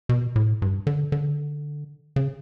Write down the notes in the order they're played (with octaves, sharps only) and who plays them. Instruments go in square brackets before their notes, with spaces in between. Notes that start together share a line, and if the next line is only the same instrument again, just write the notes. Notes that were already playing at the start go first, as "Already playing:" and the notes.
[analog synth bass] B2
A2
G2
D3
D3
C#3